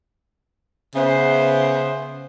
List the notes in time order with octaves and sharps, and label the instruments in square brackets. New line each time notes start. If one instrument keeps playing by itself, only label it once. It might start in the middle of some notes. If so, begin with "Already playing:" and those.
[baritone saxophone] C#3 [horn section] B3 C5 [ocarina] E5